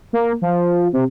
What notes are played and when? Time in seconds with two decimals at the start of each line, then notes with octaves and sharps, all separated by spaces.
0.13 A#3
0.42 F3
0.93 C3